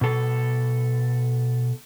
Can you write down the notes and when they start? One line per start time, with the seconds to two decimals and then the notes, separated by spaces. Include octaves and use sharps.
0.01 B2 A4